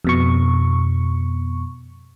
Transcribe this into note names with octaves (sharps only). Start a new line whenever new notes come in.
F2 B2 C#6